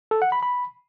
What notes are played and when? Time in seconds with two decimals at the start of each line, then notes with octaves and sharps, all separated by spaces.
0.11 A4
0.22 F#5
0.32 B5
0.43 B5